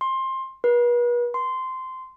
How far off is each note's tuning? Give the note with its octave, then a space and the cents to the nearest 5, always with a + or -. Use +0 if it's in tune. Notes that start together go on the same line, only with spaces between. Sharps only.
C6 +20
B4 -40
C6 -15